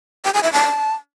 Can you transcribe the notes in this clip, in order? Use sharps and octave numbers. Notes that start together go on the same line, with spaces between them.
G5
G#5
E5
A5